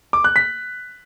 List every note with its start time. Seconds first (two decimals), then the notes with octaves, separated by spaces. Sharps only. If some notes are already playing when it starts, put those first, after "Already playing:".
0.13 D6
0.24 F#6
0.36 B6